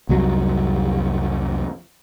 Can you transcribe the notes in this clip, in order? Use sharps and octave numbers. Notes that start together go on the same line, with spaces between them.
C2 F2 F#3 G3